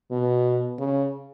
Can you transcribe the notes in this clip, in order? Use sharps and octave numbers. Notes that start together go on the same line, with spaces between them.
B2
C#3